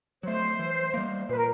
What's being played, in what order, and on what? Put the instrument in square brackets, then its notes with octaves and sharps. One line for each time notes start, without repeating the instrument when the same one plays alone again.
[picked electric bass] F#3 A3 [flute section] C5
[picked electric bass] E3
G3 A#3
[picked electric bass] A#2 [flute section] B4
[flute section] A#4